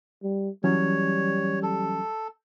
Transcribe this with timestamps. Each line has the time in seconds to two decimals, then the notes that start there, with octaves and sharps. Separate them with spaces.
0.23 G3
0.64 E3 F#3 G3 C#4 C#5
1.63 A4